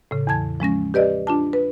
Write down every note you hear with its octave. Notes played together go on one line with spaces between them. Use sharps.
A2 C#3
E2 E3 A5 G#6
F3 G#3 C#4 A#6
G4 B4 D5 D#5
D4 F4 A5
B4